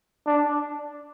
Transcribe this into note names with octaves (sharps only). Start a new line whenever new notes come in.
D4